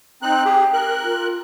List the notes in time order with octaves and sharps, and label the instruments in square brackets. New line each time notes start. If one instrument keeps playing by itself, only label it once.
[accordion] C4 D#4 F#6 [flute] G5
[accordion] G4 G#4
A#4 F#6
[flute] F4